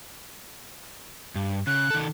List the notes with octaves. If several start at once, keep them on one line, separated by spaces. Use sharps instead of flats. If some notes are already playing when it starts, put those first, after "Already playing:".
G2
C#3 F#6
D#3 A4